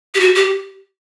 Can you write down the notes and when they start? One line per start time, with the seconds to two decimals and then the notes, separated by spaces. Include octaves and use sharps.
0.15 G4
0.20 F#4
0.36 G4